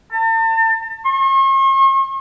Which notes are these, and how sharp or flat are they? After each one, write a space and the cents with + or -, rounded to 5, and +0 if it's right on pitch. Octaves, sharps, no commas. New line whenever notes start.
A5 +40
C#6 -45